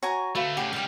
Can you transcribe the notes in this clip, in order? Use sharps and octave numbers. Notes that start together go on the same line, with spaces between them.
F#4 C#5 G#5 A#5 C#6
D2 A3 F#4 B4 F5
A2 C#3 G4 F#5
C#2 G3 F5 G5